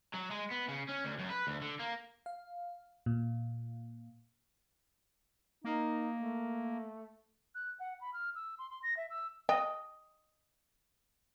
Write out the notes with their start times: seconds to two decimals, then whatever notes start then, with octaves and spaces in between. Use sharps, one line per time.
0.14 F#3
0.31 G#3
0.51 B3
0.69 C#3
0.88 C#4
1.04 D2
1.19 F#2
1.30 B4
1.47 D2
1.62 D3
1.80 A#3
2.26 F5
3.06 A#2
5.64 A#3 D#4
6.16 A3
7.55 F#6
7.80 F#5
8.01 B5
8.14 F6
8.35 E6
8.59 C6
8.70 C6
8.83 A#6
8.97 E5
9.10 E6
9.49 D#5 G5